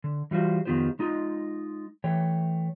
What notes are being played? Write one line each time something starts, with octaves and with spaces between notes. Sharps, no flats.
D3
E3 G3 F4 F#4 C5
F2 D#3 B3 F4 G4 C5
G#3 D#4 F4
E3 A3 C#5 G5